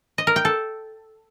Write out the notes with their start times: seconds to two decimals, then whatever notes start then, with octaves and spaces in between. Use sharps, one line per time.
0.18 D#5
0.27 A#4
0.36 G5
0.45 A4